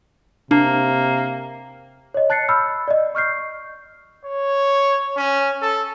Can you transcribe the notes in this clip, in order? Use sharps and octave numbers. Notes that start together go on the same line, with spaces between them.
C3 A#3 D4
C#5 D#5
A5 F#6 A6 C7 C#7
B5 E6 F6 G6
D5 D#5
C#6 F6 G6 C7
C#5
C#4
A4